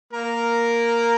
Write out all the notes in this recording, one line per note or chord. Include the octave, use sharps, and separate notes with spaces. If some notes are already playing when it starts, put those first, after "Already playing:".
A#3 A#4